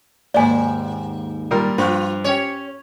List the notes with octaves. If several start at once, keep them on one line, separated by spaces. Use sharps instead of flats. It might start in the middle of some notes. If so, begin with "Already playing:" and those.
D#2 G#2 A#3 D5 G#5
A#2 G3 A#4
G2 F3 F4 C5
C#4 G4 C#5